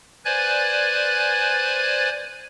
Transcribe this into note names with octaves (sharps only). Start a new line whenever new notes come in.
B4 C5 D5 G#5 F#6 G#6